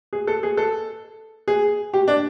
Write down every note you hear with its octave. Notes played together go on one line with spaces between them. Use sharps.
G#4
A4
G#4
A4
G#4
G4
D4